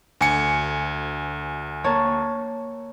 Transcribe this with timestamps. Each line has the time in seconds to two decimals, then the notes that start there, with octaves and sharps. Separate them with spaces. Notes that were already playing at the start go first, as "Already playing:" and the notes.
0.21 D2 G#5 C#7
1.84 A#3 C#5 A5